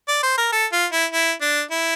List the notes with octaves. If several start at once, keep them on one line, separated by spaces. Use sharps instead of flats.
D5
C5
A#4
A4
F4
E4
E4
D4
E4